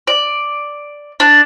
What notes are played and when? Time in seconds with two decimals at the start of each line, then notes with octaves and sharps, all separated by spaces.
0.07 D5
1.20 D4